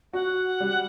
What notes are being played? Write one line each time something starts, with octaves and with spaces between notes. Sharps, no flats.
F#4 F#5
G3